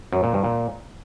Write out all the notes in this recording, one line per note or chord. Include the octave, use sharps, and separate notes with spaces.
F#2
A#2
G2
A#2